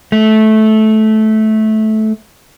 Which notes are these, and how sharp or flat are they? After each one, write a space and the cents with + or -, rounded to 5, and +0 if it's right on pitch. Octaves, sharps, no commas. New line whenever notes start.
A3 -15